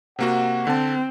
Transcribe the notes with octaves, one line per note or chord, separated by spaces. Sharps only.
C3 A#3 F#4 F#5
D3 C4 A5